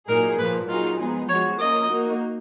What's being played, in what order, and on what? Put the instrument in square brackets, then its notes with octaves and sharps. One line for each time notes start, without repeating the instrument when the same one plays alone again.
[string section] A#2 F#3 A#3 D#4 G#4 [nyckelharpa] A#4
[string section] A#2 F3 A#3 [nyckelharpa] B4
[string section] F#3 A#3 D#4 G#4 [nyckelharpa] F4
[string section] F3 G#3 B3 D#4 G#4
[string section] F3 G#3 B3 F#4 [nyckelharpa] C#5
[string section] A#3 C#4 F4 A#4 [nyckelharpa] D#5
[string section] A#3 D#4 F#4